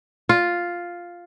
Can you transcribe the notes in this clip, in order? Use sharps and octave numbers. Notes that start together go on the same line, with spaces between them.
F4